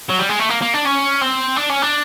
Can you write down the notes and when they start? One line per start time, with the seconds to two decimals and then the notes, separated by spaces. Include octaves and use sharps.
0.10 F#3
0.19 G3
0.29 G#3
0.40 A3
0.50 A#3
0.62 A#3
0.74 D4
0.85 C#4
1.21 C4
1.57 D4
1.70 C#4
1.82 D4